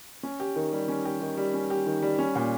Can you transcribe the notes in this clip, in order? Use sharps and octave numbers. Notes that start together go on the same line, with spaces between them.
C#4
G4
D#3
G3
C#4
G4
D#3
G3
C#4
G4
D#3
G3
C#4
A#2